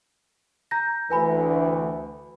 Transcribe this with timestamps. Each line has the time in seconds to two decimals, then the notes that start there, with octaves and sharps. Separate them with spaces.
0.71 A#5 G6 A#6
1.10 D2 E3 B4 G#5 B5